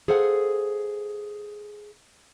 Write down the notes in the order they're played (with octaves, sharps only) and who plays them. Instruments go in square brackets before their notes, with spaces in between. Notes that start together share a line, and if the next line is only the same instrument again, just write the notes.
[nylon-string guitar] G#4 A4 C5 F5 F#5